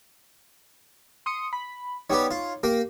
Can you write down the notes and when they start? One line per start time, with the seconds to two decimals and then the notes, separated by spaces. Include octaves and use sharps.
1.26 C6 D#6 C#7
1.53 B5
2.10 G3 B3 D#4 G4 C#5
2.31 F4
2.63 A#3 G4 A#4